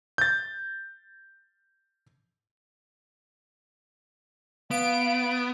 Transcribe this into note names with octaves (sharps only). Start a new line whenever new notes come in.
G6 A6
B3 F5 D7